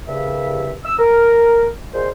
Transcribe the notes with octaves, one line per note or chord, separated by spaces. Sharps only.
C2 G2 C#3 E5
E6
A#4
A#2 G#3 C5